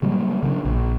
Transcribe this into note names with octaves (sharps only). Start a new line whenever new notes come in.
C#3 F#3 G3 A#3
C#3 F#3 C#4 D4
A#1